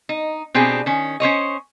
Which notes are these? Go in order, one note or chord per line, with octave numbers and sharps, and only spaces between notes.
D#4
B2 C4 D4 G4 G#4
D#3 C#4
C#4 C5 C#5 D#5